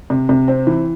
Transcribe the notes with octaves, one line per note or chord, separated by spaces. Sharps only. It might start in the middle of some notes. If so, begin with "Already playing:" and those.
C3
C3
C4
E3